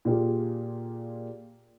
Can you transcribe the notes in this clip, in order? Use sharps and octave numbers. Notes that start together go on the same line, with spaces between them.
A#2 F4 G4 G#4